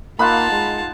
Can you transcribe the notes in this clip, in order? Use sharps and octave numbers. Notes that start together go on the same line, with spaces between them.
A#3 D#4 F4 F#5 A5 B5 C6
G#3